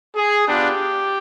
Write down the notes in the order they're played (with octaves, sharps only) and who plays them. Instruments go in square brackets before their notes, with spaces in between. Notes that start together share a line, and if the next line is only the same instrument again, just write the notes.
[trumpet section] G#4
B3 D4 F4 G4